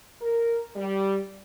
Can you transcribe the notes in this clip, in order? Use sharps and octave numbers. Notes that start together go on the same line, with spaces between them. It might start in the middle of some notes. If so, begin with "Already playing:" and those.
A#4
G3